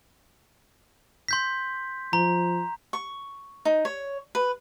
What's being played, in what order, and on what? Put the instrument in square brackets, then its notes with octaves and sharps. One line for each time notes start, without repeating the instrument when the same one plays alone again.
[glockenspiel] C6 G6 B6
[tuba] F3 [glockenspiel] A#5
[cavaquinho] C#6
D#4
C#5
B4